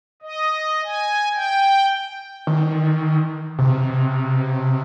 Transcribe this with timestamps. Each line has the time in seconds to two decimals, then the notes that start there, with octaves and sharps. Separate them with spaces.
0.22 D#5
0.84 G#5
1.34 G5
2.47 D#3
3.59 C3